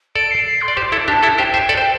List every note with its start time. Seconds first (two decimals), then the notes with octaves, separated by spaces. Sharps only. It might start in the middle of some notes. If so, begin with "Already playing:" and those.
0.15 A4 D5 D7
0.31 C7
0.46 C7
0.61 C6
0.68 D5
0.76 G4 C5 D6
0.92 E4 A4
1.08 D4 G4 A5
1.23 E4 A4
1.38 G4 C5 G5
1.54 C5 E5
1.69 A4 D5
1.77 C5